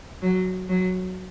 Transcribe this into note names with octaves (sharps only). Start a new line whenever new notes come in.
F#3
F#3